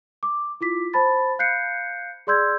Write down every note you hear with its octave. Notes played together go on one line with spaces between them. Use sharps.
D6
E4 F4 D6 B6
C5 A5 B5 A6
F5 F#6 G6 C7 C#7
G#4 D5 C6 E6 G6 G#6